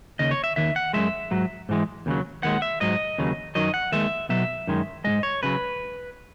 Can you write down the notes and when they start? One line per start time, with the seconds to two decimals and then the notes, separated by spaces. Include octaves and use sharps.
0.19 D#2 C#3 D#5
0.31 C#5
0.44 E5
0.56 D#2 D#3 E5
0.76 F#5
0.93 F#2 C#3 G#3 E5
1.31 G#2 F#3
1.69 G#2 E3 G#3
2.06 D#2 C#3 F#3
2.43 D#2 D#3 G#3 F#5
2.62 E5
2.81 G#2 F#3 D#5
3.18 D#2 C#3 F#3
3.55 F#2 D#3 F#3 D#5
3.74 F#5
3.92 D#2 D#3 G#3 E5
4.29 B1 B2 F#3 E5
4.67 F#2 D#3 G#3
5.04 G#2 D#3 G#3 D#5
5.23 C#5
5.43 C#3 F#3 B4